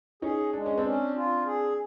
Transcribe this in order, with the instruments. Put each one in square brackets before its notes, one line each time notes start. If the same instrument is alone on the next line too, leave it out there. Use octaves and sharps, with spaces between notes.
[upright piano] C#4 D#4 [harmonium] G#4
[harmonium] G#3 [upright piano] D4
[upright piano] C#4
C4 D4
[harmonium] C#4
F4
G#4